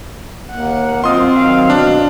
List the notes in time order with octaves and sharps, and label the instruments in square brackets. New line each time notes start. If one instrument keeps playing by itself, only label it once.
[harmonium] D#2 [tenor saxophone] A#3 [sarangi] F#5
[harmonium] F#2 D#5 [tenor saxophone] C4 [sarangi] F4 [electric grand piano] C6 D#6
[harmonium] D#3 F#3 [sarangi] F5
[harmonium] B2 [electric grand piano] D4